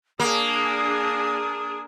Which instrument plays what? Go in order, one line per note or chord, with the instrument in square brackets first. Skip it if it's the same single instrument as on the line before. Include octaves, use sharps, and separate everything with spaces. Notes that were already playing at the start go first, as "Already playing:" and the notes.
[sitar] A#3 [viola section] D4 G#4 [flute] D#6